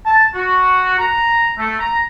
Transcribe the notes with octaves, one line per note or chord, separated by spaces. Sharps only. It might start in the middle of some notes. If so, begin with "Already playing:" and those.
A5
F#4
A#5
A3
A#5